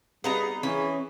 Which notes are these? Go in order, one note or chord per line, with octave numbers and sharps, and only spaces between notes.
G3 B3 D#4 G#4 A#5
E3 C#4